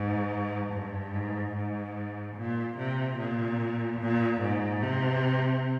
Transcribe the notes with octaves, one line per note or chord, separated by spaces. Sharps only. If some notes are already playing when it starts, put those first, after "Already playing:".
Already playing: G#2
G2
G#2
G#2
A#2
C3
A#2
A#2
G#2
C3